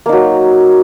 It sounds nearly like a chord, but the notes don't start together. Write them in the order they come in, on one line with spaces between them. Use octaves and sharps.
A#3 D#4 F#3